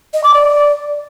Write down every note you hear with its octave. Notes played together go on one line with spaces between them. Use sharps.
D#5
D6
D5